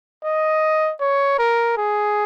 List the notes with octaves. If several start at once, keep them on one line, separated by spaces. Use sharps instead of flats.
D#5
C#5
A#4
G#4